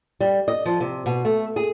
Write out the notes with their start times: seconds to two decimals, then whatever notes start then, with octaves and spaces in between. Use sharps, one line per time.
0.20 G3
0.48 D#5
0.66 F3
0.80 C3
1.06 B2
1.25 A3
1.56 G#4